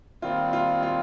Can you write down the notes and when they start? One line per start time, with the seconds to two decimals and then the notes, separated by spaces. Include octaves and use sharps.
0.22 D#2 D#3 G3 C4 F4
0.53 F4
0.83 F4